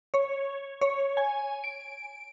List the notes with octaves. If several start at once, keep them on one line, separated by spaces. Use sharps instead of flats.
C#5
C#5
G#5
D7